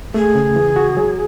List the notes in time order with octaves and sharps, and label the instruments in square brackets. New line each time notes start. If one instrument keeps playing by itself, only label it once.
[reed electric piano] A3 [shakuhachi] G#4
[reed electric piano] C#3
E3
F#4
F#3